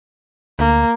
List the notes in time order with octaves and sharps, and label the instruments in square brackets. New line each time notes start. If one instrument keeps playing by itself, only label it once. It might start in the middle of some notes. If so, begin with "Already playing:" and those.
[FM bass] D2 [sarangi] A#3